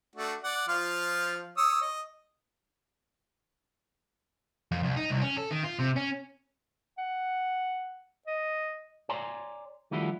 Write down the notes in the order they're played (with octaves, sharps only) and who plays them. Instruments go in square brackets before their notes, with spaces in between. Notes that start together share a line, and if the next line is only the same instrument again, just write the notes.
[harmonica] A3 D4 F#4
D5 F#5
F3 F4 F6
C#5 D#6 E6
D#5
[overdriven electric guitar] F2
C2
D#4
C2
C#4
A4
D#3
F4
C3
C#4
[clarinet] F#5
D#5
[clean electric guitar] C#5 D5 G#5 A#5 C6
D#3 F3 G3 A3 E4 F#4